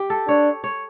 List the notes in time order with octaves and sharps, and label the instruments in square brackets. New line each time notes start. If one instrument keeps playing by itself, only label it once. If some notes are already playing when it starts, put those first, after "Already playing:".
Already playing: [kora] G4
A4
[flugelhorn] D4 [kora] C#5
[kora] C#5